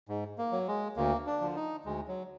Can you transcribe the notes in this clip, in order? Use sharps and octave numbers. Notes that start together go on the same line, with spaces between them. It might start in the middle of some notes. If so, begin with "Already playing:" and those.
G#2
A#3
F#3
G#3
D2 A#3
D4
D3 F3
D#4
D2 G#3
F#3